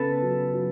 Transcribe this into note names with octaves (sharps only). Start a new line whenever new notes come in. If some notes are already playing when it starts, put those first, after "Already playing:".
Already playing: C#3 B3 A4 B4
F#3
F#3